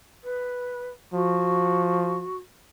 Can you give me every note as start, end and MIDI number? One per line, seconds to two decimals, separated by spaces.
0.23 0.88 71
1.13 2.28 53
1.13 2.36 66